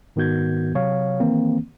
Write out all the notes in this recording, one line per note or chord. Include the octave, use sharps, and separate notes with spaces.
G#2 D#3 B3 F#4 G6 G#6
C3 F#3 C#5 F5
D#3 E3 A#3 C4